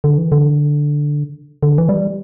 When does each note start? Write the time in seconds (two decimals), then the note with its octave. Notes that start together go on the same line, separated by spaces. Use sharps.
0.04 D3
0.18 E3
0.32 D3
1.63 D3
1.78 E3
1.89 G3